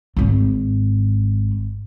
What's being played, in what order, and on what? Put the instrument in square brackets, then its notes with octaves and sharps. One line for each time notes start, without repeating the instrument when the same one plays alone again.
[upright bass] G#1 G#2